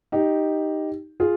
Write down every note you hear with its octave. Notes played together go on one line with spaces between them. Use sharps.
D#4 G4
F4 G#4